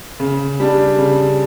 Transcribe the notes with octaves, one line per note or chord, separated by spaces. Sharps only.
C#3
G3 D4
C#3